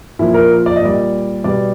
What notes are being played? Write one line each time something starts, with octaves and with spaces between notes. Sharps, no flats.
A#2 F3 E4
A#4
D5
D#5
A#2 G3 D5
B2 G3 D5